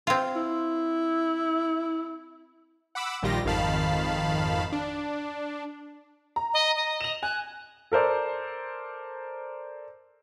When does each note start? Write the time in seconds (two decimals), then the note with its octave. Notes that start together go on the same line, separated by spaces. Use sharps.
0.07 C4 F4
0.35 E4
2.95 F#5 B5 D6 E6
3.22 A#1 D#3 G3 F4 G4 A#6
3.45 G#1 F2 D#3 F5 A5 B5
4.72 D4
6.36 A#5
6.54 D#5
6.76 D#5
7.01 E7 F7
7.23 G#5 F#6
7.92 A4 A#4 C5 D5